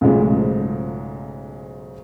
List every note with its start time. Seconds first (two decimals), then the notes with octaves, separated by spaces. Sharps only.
0.01 B1 G#2 C#3 F3 G#3 A3